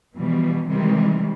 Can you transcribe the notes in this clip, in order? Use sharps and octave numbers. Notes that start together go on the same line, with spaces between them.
B2 E3 F3 G3
C3 D#3 E3 G3 G#3